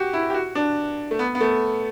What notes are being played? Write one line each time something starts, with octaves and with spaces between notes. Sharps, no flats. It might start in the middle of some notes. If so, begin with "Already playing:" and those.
Already playing: F#4 G4
E4
G4
F#4
D4
A3
B3
B3
A3